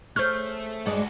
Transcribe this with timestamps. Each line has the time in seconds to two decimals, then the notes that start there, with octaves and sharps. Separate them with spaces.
0.16 A3 G#4 C5 C#5 F6 G6
0.86 G2 G#3 F#4 A4 D5